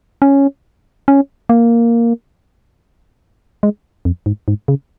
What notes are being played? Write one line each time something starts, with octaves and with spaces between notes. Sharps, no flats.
C#4
C#4
A#3
G#3
F2
G#2
G#2
C#3